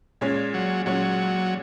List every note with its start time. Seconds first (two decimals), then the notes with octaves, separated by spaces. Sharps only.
0.21 A#2 G#3 C#4
0.54 F#3
0.86 A#2 F#3 G#3 C#4